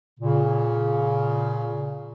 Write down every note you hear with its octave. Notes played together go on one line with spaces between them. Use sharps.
A#2 C#3